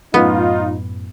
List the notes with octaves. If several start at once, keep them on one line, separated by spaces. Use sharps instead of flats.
F#2 A2 B3 D#4 F4